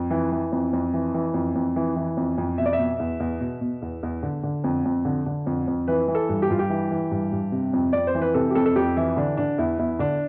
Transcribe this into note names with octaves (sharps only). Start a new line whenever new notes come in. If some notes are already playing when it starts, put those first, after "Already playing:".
Already playing: F2
E3
E3
F2
F2
E3
E3
F2
F2
E3
E3
F2
F2
B2 E5
D5
E5
B2
E2
E2
B2
B2
E2
E2
D3
D3
F2
F2
D3
D3
F2
F2
E3 B4
E3
A4
G2
G4
G2 F4
G4
E3
E3
G2
G2
C3
F2
F2 D5
C5
E3
B4
C3 A4
G4
F2 A4
A4
F2 G4
E3 E4
D3 D4
D3 D4
E2 E4
E2 E4
D3 D4